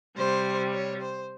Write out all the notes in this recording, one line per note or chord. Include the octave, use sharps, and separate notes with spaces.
C3 G3 C5
C#5
C5